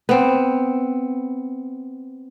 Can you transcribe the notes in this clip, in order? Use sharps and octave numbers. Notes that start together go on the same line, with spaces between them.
B3 C4